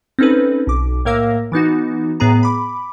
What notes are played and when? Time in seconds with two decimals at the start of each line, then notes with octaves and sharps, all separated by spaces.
0.19 C4 C#4 D#4 A4 B4
0.67 B1 D6
1.05 A2 A#3 A#4 F5 E6 A#6
1.52 E3 B3 D#4 F#4
2.20 A2 B3 G#4 A#5
2.43 B5 D6